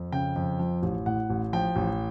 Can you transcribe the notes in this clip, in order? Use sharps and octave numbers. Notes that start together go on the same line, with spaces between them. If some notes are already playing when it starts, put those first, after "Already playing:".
Already playing: F2
C#3 G5
F2
F3
A1
A2 F#5
A1
F3 G5
A1